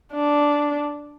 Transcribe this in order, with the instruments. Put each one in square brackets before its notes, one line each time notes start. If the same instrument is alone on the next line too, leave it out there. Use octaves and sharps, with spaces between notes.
[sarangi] D4